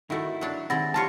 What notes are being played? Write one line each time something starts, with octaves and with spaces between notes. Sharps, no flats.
D#3 A3 D#4 E4 F#4
F#3 D4
D#3 G#3 C4 E4 F#5 A6 A#6
G3 F4 C#5 A5